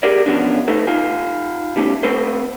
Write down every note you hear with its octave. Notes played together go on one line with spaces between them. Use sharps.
G4 G#4 A#4 D5
B2 E3 F3 B3 C#4 D4
A3 D#4 A4 B4
D#4 F4 G#5
B2 G3 A3 C#4
A3 C4 A4 B4 C5